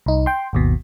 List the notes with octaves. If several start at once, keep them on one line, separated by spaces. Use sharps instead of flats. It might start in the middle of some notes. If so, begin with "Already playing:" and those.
C2 D#4
G5 C6
G#1 D#2 B2